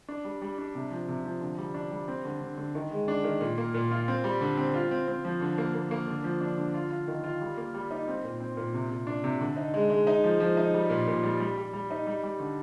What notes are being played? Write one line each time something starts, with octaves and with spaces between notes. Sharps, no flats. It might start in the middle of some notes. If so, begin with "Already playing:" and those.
D4
G3
G3
D4
C3
F3
C3
F3
D3
G3
D4
G3
C4
D3
D3
D3
D#3
G#3
D4
D#3
A#2
A#3
A#2
F4
C4
G3
D3
C4
F4
C4
C4
F3
D3
A#3
A#3
A#3
D3
F3
D4
D3
F4
F4
D#3
F4
G3
A#3
G3
D#4
C4
A#2
C4
A#2
C3
C3
D4
C3
D3
D#4
G#3
G#3
D#4
F3
F3
D#4
G3
A#2
A#2
G3
G3
G3
G3
D#4
G3
G3
D3